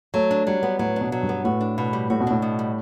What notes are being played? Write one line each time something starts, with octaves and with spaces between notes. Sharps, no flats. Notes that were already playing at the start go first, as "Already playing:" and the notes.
F#3 A3
D4
F#3 G3
B3
A2 F#3
B2 D4
F#3
G2
B3
A2 F#4
D4
B2
G3
A2 F#4
B2
A2 D4
B2
G3